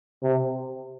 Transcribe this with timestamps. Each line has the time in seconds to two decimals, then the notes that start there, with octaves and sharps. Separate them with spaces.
0.23 C3